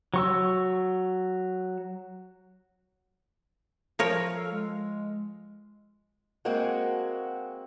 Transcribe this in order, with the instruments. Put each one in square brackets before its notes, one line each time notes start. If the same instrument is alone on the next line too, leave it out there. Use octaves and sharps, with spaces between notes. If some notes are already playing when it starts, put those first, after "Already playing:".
[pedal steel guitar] F#3 C#6 E6
[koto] F3 A#4 C#5
[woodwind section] A4 F5
G#3
[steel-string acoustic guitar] G#3 A#3 C4 F#4 G#4